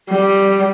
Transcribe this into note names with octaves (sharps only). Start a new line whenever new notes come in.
G3